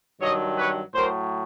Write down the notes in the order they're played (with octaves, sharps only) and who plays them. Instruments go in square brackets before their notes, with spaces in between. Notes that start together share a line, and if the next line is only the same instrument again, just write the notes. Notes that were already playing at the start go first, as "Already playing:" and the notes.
[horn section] G2 D#3 F#3 C#5 D#5
B4 C#5
A2 F#3 A#4 C5